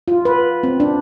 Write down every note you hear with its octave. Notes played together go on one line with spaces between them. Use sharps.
F4
B4
C4
D4